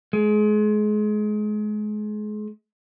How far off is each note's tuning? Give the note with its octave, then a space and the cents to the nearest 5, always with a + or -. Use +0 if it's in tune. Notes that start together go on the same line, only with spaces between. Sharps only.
G#3 +30